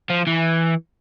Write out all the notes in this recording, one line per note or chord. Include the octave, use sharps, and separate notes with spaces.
F3
E3